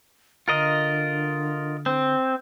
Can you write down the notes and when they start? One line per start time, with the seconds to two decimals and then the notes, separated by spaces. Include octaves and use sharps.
0.48 D3 F4 A#4 D#5
1.86 C4